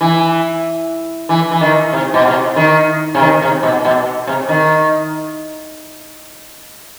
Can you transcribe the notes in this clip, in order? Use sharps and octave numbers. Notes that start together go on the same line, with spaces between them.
E3
E3
E3
D#3
C3
B2
C3
D#3
C3
D#3
C3
B2
B2
C3
D#3